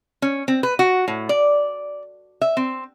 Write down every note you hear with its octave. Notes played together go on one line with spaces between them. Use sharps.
C#4
C4
B4
F#4
A2
D5
E5
C4